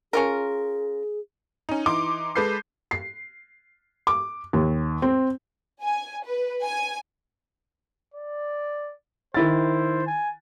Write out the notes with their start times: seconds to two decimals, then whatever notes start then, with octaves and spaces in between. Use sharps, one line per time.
0.13 C#4 F4 G#4 A#4
1.69 C#4 D#4
1.86 E3 D#4 C6 D6
2.36 G#3 A4 B4 G6 C7
2.91 C7
4.07 D6
4.53 D#2
5.02 C4
5.82 G#5
6.25 B4
6.63 G#5
8.14 D5
9.34 D#3 E4 C5 A6
10.06 G#5